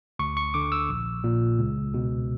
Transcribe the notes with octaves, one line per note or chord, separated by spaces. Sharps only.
D2 C#6
C#6
D3 D6
E6
A#1
A#2
C#2
B2